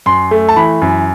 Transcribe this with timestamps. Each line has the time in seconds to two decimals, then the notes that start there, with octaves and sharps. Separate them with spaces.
0.06 F#2 C6
0.31 A3
0.49 A5
0.57 E3 B5
0.82 F#2